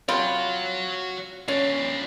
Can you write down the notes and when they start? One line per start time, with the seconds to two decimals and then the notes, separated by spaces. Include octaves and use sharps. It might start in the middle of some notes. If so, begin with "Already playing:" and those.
0.09 C3 F4 F#4 C#5 B5
1.48 C#4 D4 F4